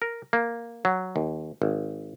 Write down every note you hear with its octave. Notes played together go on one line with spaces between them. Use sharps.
A#4
A#3
F#3
D#2
G#1